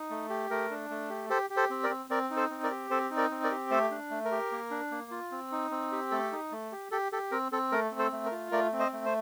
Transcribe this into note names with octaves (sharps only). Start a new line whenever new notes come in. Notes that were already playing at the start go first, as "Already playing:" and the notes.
Already playing: D#4
A3
G4
A3 A#4
D4
A3
G4
G4 A4 C5
G4
A4 C5
C4
A#4 D5
C4
C4 A#4 D5
D#4
A4 C5
C4
A#4 D5
G4
C4 A4 C5
D#4
A#4 D5
C4
A#4 D5
G4
A3 A4 C5
D4
A3
A#4
G4
A#3
D4
A#3
F4
C4
D#4
C4
G4
A3 A4
D#4
A3
G4
G4 A4
G4 A4
C4 A#4
C4 A4
A3 A#4
C4
A4 C5
A3
A#4
F4
A3 A#4 D5
C4
C5 D#5
A3
C5